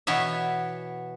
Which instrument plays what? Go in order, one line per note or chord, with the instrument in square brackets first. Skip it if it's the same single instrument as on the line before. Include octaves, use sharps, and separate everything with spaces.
[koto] B2 E3 B3 C#5 E5